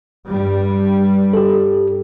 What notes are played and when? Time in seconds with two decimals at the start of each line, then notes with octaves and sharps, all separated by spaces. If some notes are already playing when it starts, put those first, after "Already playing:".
0.28 G2 G3
1.33 G4 A4